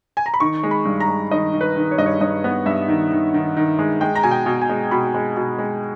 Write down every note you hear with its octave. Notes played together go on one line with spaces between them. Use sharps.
G#5
A#5
B5
D#3 C#6
G#3
B5
G2
A#5
G#3
D#3 D#5
D#3
B4
D#3
C#5
G2 D#5
C#5
G2 D#5
B3
G2 E5
D#3
D#3
D#3
D#3
G#3
G#3 G5
A#5
B2 G#5
G5
B2
G#5
G#3
B2 B5
G#3
B2
G#3